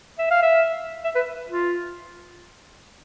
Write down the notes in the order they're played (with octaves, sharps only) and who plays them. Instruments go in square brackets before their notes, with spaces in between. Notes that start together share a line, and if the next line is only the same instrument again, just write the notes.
[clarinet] E5
F5
E5
E5
B4
F4